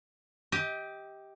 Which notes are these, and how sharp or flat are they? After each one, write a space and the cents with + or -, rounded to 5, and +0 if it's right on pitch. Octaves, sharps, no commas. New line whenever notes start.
G4 +0 D#5 +35